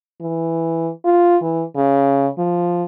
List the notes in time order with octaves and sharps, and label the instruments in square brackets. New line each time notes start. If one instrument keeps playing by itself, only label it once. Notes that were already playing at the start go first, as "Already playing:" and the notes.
[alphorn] E3
F4
E3
C#3
F3